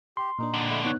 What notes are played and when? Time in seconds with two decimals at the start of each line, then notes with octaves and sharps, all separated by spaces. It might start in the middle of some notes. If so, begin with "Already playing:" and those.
0.17 G4 C6
0.38 A#2 A#3 D4 D#4
0.54 F2 D3
0.69 G#3 A3 E4
0.85 B3 D#4 C#5 F#6